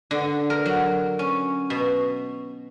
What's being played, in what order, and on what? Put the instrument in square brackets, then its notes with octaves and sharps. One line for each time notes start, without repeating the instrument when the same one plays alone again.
[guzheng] D3
A#4
F#3
C#4
B2